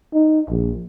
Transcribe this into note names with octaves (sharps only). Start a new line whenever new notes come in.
D#4
A#1